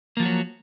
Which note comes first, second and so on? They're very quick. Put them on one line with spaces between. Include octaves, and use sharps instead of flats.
A#3 F3 F#4 F#3